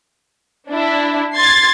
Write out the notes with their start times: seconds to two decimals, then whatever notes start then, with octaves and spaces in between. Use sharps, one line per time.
0.70 D4 E4
1.35 C6 G#6 A6 C7